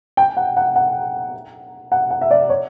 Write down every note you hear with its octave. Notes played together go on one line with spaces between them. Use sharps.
G5
F#5
F#5
F#5
F#5
F#5
E5
D5
C#5